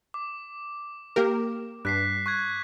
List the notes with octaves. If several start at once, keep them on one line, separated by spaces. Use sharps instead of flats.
D6
A#3 G4 A#4
G2 F#6 B6 C7
C#6 F#6 G#6